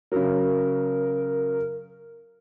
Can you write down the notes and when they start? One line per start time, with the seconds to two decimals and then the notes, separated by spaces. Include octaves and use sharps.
0.12 C#3 F#3 A#4